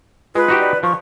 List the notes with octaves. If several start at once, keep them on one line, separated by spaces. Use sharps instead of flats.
G#3 F4 B4
D#4 F#4 G4
D5
F3 C#6